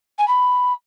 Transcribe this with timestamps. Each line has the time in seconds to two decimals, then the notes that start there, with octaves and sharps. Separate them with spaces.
0.18 G#5
0.27 B5